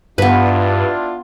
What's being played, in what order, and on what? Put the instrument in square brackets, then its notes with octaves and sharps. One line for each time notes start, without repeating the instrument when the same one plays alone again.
[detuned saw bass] G2 [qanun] B3 B4 [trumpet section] D4 E4 F4